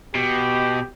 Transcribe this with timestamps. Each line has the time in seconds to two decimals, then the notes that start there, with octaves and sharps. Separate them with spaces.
0.15 B2 G4